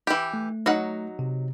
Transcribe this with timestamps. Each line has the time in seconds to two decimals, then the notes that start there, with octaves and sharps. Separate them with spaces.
0.07 E3 G4
0.34 A3
0.66 F#3 D#4 F#5
1.19 C3